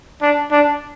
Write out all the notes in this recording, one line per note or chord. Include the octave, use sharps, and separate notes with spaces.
D4
D4